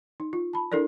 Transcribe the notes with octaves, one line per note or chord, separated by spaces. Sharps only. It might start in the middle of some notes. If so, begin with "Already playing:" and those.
D#4
F4
A5 B5
D4 E4 A4 A#4 D5